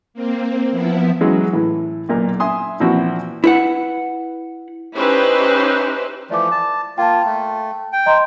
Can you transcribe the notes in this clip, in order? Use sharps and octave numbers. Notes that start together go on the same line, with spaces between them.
A#3 C4
F3 B3 E4
E3 F#3 G#3 C#4
A2 E3
B1 A#2 A#4
E5 G#5 C6 D#6
A#2 E3 F3 C4 E4 F#4
E4 B4 F#5
C#4 D#4 E4 G4 B4 C5
E3 F3 A3 D5 D6
A5
A#3 F4 G5 A5
A3
G5
D#5 A#5 C6